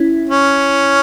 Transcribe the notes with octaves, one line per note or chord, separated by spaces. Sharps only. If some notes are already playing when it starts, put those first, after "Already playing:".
Already playing: C#4 E4
C#4